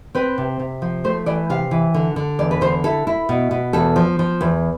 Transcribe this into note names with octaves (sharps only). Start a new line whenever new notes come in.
C4 B4
C3
C3
F3
A3 C5
E3 D5
C3 F5
E3
D3
D3
E2 D5
B4
D3 C5
E4 A4
E4
B2
B2
E2 A4
F3
F3
E2